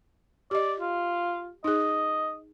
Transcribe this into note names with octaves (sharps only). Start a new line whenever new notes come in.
G4 D5 D#5
F4
D#4 G#4 D#5